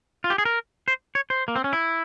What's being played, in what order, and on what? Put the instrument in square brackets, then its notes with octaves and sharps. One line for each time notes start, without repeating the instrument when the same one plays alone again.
[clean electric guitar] F4
G4
G#4
A#4
C5
C#5
C5
A#3
C4
C#4
E4